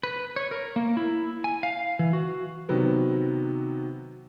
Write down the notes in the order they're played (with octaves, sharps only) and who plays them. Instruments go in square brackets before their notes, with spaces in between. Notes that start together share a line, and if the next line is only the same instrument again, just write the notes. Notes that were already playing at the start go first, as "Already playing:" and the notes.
[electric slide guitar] B4
C#5
A#4
A#3
E4
G#5
F5
E3
F#4
[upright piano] C3 D#3 F#3 B3